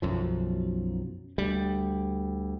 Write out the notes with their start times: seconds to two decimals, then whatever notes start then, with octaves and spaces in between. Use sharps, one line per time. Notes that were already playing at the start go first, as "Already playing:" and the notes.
0.02 B1 F#2 F3
1.38 D2 G3